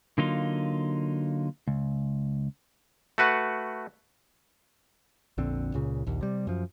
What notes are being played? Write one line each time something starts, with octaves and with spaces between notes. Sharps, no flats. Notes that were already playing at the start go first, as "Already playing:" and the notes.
D3 F#3 A#3 D#4 F4
C#2
A3 F#4 B4 F#5
A#1 F2 D3 C4
C#2 A#2 C#3
A#1 D#2
C3 G3
F#2 F3